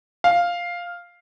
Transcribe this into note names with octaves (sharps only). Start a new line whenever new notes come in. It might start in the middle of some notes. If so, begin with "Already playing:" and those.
F5